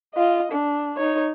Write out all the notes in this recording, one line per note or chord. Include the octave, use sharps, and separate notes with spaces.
F4 D#5
D4
D#4 C#5